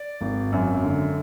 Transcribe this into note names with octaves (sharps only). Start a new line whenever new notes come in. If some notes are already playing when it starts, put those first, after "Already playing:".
Already playing: D5
G#1
F#2
D3